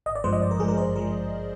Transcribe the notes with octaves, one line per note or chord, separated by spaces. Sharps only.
G#1 D#5
D5
G2 F3 G#3 C5
D#5
G#1 D5
A#4
G2 F3 G#3 G#4
A#4
G#1 C5
F3 G#3 A#4